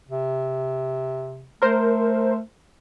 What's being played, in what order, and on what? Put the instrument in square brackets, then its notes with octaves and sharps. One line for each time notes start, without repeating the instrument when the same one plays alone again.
[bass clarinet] C3
[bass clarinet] A3 [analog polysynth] A#4 C5